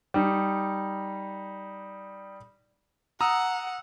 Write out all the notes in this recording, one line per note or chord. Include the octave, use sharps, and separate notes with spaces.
G3 D#4
F#5 A#5 D#6 E6